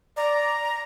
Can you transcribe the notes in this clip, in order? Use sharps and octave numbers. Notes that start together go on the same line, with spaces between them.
D5 A#5